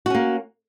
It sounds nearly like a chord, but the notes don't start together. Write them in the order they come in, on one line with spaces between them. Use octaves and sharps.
F#4 C#4 A#3